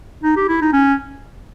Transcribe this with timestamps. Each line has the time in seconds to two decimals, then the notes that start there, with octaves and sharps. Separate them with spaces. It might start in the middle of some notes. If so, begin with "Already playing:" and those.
0.23 D#4
0.37 G4
0.48 E4
0.62 D#4
0.73 C#4